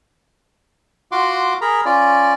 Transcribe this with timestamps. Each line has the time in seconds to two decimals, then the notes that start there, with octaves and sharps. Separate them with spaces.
1.12 F4 F#4 F#5 C6 D6
1.61 G#4 A#4 A#5 B5
1.85 C#4 F4 D5